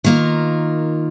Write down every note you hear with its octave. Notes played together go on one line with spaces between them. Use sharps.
D#3 A#3 F4